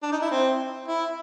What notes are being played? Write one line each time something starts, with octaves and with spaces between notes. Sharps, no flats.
D4
D#4
E4
C4
E4